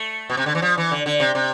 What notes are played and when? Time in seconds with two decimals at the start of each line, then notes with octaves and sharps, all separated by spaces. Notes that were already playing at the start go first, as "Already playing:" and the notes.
Already playing: A3
0.30 B2
0.37 C3
0.46 D3
0.55 E3
0.62 F3
0.78 E3
0.91 D3
1.06 D3
1.20 C3
1.35 C3